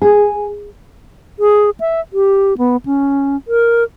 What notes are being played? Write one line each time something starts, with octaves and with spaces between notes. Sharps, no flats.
G#4
G#4
E5
G4
B3
C#4
A#4